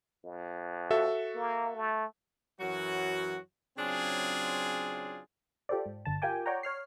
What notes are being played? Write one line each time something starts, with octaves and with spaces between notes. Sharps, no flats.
F2
F#4 A4 E5
A#3
A3
F#2 E3 F#3 F#4
C#3 F#3 C4 D4 F4 G#4
F4 G4 A4 C5 D5
G#2
G1 D3 A5
F4 G4 A#4 G5 G#5 D6
C#5 D5 F#5 G5 A#5
C#5 F6 C7